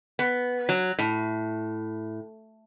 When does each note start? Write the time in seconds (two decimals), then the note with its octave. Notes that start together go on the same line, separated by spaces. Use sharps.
0.19 B3
0.69 F#3
0.99 A2